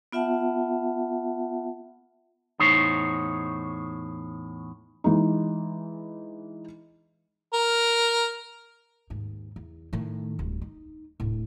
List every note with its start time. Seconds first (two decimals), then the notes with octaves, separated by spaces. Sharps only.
0.12 B3 F4 E5 F#5 A5
2.59 E2 A2 D#4 C5 C#5
5.04 E3 G#3 D#4
7.54 A#4
9.10 D#2 G#2
9.56 E2
9.93 A2 D#3
10.39 D1 G2
10.62 D#4
11.20 D1 A2